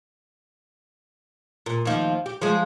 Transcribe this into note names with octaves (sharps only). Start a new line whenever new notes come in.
A#2
D#2 F3
G4
F3 G#3